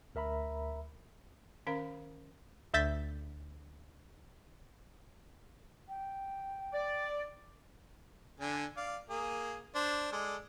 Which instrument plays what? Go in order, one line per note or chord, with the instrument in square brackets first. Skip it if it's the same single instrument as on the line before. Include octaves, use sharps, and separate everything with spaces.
[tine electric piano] D2 A#4 E5 A#5 B5
[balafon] D#3 C#4 A#4 F5 A#5
[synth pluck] D2 E5 G6 A6 B6
[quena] G5
[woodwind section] D5
[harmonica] D3 D4 G#5
D5 F5
A#3 G#4 D#6
D4 C5
G#3 A4 D5